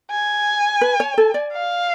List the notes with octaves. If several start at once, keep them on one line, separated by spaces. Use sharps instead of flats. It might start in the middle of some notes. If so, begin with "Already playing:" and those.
G#5
B4
C#5
A4
D5
F5